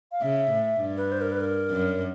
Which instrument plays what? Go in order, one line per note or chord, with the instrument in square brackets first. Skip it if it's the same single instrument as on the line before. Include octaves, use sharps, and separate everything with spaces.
[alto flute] F5
[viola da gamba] C#3 [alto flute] E5
[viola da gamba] A2
G2
[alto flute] B4
C5
A#4
B4
A#4
[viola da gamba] F#2